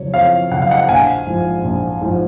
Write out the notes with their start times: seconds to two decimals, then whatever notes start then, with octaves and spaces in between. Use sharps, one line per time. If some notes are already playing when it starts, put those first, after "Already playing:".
Already playing: F2 C#3 F#3 C#5
0.14 F2 C#5 F5
0.51 C#3 F#3 F#5
0.62 F5
0.70 D#5 F#5
0.84 F#5
0.89 A#1 F5 G#5
1.26 G#2 F3
1.64 A#1
2.01 G#2 F3